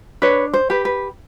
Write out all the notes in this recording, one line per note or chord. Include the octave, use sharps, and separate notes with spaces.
D4 B4 C#5
C5
G4 B4
B4